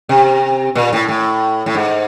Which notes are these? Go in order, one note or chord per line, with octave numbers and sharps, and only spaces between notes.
C3
A#2
A2
A2
A2
G#2